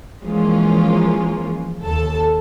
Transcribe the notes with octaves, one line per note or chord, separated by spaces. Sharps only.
E3 F3 G#3 A#3 C#4 F4
D#2 A4 A5